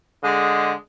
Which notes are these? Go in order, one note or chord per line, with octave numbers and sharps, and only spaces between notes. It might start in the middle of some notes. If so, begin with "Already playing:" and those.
D3 G#3